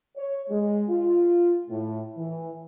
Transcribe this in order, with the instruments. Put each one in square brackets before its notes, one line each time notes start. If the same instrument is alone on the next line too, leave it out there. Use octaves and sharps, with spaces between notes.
[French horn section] C#5
G#3
F4
A2
E3